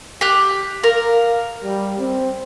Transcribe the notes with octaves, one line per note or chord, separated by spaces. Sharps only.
G4 F#6
A#4 F5
G3
C4